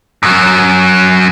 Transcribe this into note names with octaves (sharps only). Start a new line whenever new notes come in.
F#2 F#3